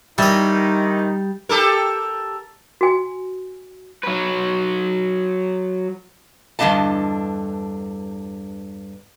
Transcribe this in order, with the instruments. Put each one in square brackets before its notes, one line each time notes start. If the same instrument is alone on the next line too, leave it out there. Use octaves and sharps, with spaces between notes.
[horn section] D#3 D#4 [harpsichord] E3 D#5 [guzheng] G3
[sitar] G4 A4 A#4
[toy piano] F#4 G#5
[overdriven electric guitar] F#3 B4
[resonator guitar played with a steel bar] E2 G2 D3 B3 D#5 A5